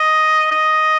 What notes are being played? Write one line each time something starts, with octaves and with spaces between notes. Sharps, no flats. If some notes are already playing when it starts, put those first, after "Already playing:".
Already playing: D#5
D#5